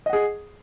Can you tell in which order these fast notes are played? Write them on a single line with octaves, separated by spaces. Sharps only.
D#5 F#5 G#4